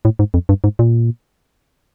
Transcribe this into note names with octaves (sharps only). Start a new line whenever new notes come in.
A2
G#2
F2
G2
G#2
A#2